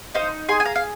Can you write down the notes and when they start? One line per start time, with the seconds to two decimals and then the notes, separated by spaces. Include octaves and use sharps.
0.15 D#4 C5 F5
0.48 G#4 G#5 C6
0.60 G#5
0.65 F5 A#5
0.76 F5